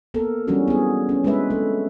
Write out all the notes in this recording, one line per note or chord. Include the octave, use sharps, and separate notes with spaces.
A#3 B3 A4 A#4
E3 F#3 G3 C#4 D4 F#4
B3 G#4
C#4
G#3 C4 D4 B4 E5
A3